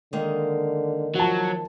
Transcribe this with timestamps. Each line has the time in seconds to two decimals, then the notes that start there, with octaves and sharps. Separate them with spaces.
0.13 D3 D#3 G#3 A#3
1.15 F3 F#3 A5